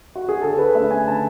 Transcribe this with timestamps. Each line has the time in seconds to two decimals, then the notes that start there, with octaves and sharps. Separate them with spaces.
0.15 F#4
0.29 G#4
0.41 D3 A4
0.58 B4
0.75 A3 C#4 E5
0.91 G#5
1.07 D3 A5